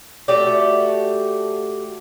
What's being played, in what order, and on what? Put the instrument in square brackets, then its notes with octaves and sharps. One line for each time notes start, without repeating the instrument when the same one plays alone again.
[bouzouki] A3 F#4 G4 D5